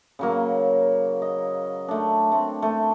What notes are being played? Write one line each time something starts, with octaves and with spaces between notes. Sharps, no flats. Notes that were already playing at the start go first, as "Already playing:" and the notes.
C#3 F#3 A#3
D#5
A3 D4
A3 C4
A3